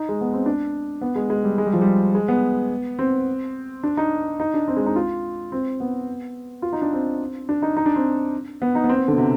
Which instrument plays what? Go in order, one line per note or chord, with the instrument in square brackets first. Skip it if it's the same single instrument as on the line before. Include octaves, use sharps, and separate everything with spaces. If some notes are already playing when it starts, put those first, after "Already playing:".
Already playing: [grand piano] D#4
G#3
B3
C4
D4
B3
G#3
G#3
G3
G#3
G3
F3
G3
G#3
B3
C4
D4
D#4
D#4
D4
C4
G#3
D#4
F4
C4
B3
F4
D#4
D4
C4
D4
D#4
D#4
D4
C4
B3
D#4
B3
C4
B3
D3
B2
C3